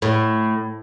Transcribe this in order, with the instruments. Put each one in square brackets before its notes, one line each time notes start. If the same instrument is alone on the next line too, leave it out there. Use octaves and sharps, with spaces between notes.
[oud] A2